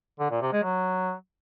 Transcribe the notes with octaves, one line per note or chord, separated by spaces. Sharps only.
D3
A#2
C3
G#3
F#3